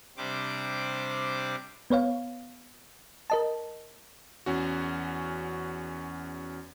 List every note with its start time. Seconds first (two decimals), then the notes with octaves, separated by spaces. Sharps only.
0.17 C3 G3 D4 C5 D6
1.90 B3 B4 C#5 F5
3.30 A#4 D#5 A5
4.46 E2 C#4 F#4